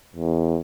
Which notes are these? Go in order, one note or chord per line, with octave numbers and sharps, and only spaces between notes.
E2